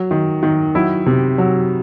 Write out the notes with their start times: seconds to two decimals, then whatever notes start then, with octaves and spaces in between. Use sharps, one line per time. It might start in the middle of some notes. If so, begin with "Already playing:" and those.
Already playing: F#3
0.11 D#3
0.43 D#3
0.75 F#3 E4
1.06 C3
1.38 F#3